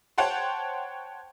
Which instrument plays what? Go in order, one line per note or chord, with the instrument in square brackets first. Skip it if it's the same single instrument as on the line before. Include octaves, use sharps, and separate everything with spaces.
[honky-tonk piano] C5 C#5 F#5 G5 A5 C6